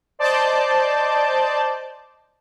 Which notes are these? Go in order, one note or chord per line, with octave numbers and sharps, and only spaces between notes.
C5 D5 D#5 A5 D6 G6